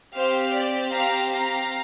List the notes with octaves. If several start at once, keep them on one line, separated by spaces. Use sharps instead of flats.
C4 G4 C5 F5
D5
F5 A#5
F5 A#5